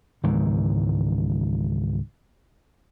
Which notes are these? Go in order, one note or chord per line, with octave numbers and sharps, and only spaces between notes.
C#2 G#2 D#3 E3